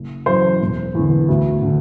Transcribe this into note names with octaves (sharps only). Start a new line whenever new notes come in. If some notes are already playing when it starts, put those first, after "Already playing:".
Already playing: F#1
F#2 E3 C5
E1
E2 D3
D2
D3